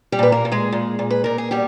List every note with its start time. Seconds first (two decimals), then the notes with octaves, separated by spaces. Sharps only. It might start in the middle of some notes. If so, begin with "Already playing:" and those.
0.12 G3 G4
0.19 A#2 B4
0.32 A#3 A#4
0.45 A#2
0.52 G#3 G#4
0.72 A#2
0.99 A#2
1.10 B4
1.24 A#2 A#4
1.38 G#4
1.51 B2 G3 G4